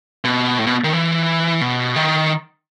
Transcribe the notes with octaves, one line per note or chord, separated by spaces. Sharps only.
B2
A2
B2
D#3
E3
B2
D#3